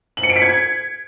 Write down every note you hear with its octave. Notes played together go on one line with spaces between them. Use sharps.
F#7
C#7
D7
B6
G#6